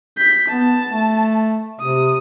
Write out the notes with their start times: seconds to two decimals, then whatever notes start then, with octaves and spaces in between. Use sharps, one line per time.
0.18 G6 B6
0.49 B3 A5
0.90 A3
1.80 C3 D#6